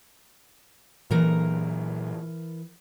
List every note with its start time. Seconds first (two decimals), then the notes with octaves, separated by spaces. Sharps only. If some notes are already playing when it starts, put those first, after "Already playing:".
1.11 A#2 E3 F#3 A#3 A#4 A#5